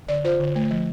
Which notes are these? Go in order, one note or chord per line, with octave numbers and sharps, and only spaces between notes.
D3 D5
F4 C5
D3
A3
F3